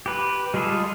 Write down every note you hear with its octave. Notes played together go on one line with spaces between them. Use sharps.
G4 B4
G3 G#3 F4 G#4 A4